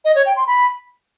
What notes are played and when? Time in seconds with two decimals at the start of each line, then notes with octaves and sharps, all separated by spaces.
0.05 D#5
0.15 C#5
0.26 G5
0.37 C6
0.47 B5